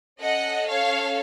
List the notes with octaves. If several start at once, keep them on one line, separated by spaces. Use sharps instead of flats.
C#4 A4 D#5 F#5
C#5 F5